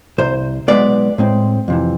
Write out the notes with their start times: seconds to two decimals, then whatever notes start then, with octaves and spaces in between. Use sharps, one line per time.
0.18 C2 C3 C5
0.68 B1 A2 G#3 B3 B4 D5
1.18 A2 G#3 C4
1.68 F2 C3 E3